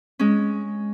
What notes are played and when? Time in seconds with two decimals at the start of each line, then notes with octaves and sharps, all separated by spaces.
0.19 G#3 C#4